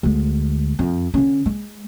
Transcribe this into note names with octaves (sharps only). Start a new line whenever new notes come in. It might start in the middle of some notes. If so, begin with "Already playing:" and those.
D2 G#3
F2
D3 C#4
G#3